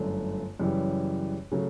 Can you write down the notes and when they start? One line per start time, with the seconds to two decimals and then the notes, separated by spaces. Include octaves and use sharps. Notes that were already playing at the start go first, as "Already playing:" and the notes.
Already playing: G1 F#2 D3 A3
0.60 F#2 C#3 E3 G3
1.52 C#3 F#3 A3